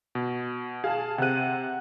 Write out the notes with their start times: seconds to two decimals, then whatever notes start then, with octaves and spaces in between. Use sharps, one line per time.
0.15 B2
0.84 G#4 F5 A5
1.18 C3 C4 F#5 F#6 D#7